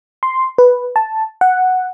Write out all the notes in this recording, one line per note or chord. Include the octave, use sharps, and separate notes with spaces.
C6
B4
A5
F#5